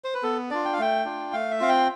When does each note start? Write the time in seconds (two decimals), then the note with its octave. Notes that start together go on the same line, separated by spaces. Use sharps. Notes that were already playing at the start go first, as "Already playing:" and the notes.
0.04 C5
0.14 B4
0.23 B3 A4
0.51 D4 F4 D5
0.65 G5
0.73 F5
0.78 A3 G5
1.05 D4 F4
1.33 A3 F5
1.51 E5
1.60 C4 F4 F5
1.69 G5